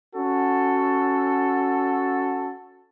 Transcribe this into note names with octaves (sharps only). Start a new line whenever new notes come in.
C#4 F#4 A4